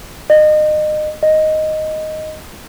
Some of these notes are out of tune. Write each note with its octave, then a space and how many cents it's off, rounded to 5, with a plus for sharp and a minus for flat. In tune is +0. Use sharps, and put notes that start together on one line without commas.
D#5 -30
D#5 +0